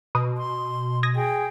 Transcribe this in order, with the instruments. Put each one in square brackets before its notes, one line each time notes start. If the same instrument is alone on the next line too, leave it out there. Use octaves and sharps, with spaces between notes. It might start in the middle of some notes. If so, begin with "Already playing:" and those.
[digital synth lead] B2 [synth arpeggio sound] B4 D#6
[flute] C6
[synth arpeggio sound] D#6 G#6 A#6
[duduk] G#4 [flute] G5